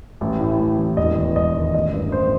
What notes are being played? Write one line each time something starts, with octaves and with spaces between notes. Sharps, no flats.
A1
A2
A1
E3
E1 D#5
E2
E1 D#5
D#3
A1 D#5
G2
A1 C5